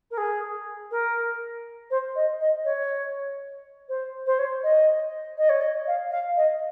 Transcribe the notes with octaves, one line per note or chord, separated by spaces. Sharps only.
A#4
G#4
A#4
C5
D#5
D#5
C#5
C5
C5
C#5
D#5
D#5
C#5
D#5
F5
F5
D#5